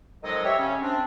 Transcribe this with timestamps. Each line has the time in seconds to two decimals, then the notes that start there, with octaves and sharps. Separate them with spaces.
0.23 F2 D#3 F#3 G#3 A4 D#5
0.45 G4 C#5 E5
0.58 C#3 C#4
0.81 C4 D4